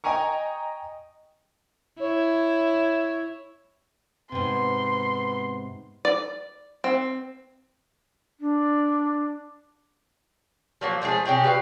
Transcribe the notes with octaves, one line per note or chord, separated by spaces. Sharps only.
D#5 G5 G#5 A#5 C#6
E4 C#5
G#2 C3 B3 C6
D5
C4
D4
F3 F#3 A#3
F3 G#3 A3 G#4
C3 C#4 G4 G#4
G3 F#4 B4 F5